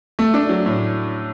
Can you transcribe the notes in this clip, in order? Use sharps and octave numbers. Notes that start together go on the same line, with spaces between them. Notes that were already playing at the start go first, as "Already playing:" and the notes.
A3
D4
F#3
A2